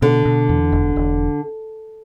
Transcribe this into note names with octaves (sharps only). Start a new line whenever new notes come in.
B2 D3
B2
E2
E1
E1